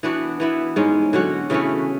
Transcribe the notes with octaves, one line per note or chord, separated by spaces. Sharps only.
E3 B3 D4 F#4
E3 B3 E4
G#2 G#3 C#4
D3 F#3 C#4 F#4
C#3 E3 A3 C#4